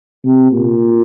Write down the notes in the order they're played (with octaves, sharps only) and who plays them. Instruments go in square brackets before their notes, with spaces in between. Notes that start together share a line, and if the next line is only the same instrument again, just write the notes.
[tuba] C3
A#2